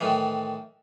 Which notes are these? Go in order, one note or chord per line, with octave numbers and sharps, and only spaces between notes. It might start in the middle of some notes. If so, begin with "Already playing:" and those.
A2 D#3 E3